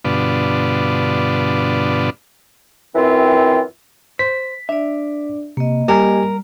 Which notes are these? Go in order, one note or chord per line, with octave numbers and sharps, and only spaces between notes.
G2 B2 D3 B3 D4 F4
F#2 E3 C4 F4 G5
C5 B6
D4 D5 E5
C3 A#3 D#5
G3 G4 A#4 G#5